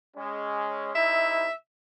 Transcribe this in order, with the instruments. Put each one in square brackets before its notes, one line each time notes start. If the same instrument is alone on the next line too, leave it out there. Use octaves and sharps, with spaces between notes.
[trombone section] G#3 C#4
[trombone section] C3 D#4 E4 [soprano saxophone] E5